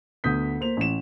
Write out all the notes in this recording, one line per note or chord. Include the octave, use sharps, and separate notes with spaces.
D2 B3 D#6 G6 B6
A#3 C5 F7
A1 E7